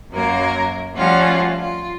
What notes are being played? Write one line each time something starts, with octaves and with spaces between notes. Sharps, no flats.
F#2 F#3 A#3 A#4
F3 G3 A3 C#4 F4 F#4
F4